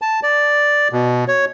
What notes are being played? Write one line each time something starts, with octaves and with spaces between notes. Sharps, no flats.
A5
D5
B2
C#5